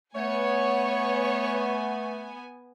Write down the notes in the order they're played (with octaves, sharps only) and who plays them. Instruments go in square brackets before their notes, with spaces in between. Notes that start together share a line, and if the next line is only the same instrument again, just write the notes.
[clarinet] A3 [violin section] B3 G#5 [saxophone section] C#5 [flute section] F#5 C#6